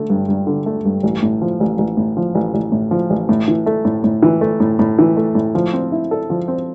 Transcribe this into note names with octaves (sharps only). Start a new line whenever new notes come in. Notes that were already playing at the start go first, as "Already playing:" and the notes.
Already playing: D3 A3
G2
G2
D3
A3
G2
A1
A2
F3
A1
A1
A2
F3
A1
A1
A2
F3
A1
A2
E3
A3
A2
A2
E3
A3
A2
A2
E3
A3
A2
F3
C4
E4
A4
F3
C4